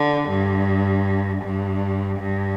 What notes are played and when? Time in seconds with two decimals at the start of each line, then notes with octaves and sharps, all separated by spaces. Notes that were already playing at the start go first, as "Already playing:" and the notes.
Already playing: D3
0.30 G2
1.43 G2
2.19 G2